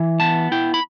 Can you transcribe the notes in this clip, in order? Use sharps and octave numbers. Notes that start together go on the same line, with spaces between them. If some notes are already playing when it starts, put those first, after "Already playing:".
Already playing: E3
B3 A5
E4 G5
B5